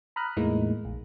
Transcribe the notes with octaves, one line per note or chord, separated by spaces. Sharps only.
A#5 B5 D#6 F6 F#6
E2 A2 E3 G#3 A#3 D#4
A#1